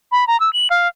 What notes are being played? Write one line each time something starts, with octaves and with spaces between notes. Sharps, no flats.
B5
A#5
E6
F#7
F5